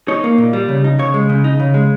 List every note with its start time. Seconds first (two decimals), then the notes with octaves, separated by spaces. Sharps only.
0.08 D#4 C#5
0.24 A#3
0.38 A#2
0.53 G3
0.69 C#3
0.84 D#4
0.99 C#3 C#5
1.14 G#3
1.29 C#3
1.44 D#4
1.60 C#3
1.74 G#3